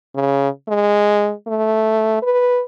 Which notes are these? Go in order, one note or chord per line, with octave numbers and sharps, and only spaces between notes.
C#3
G#3
A3
B4